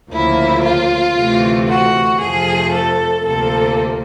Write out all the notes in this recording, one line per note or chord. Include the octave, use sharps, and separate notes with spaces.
D2 C#3 F3 A#3 E4
F4
D2 C3 E3 A3
F#4
F2 C3 F3 A3 G#4
A4
D2 C3 F3 A#3 A4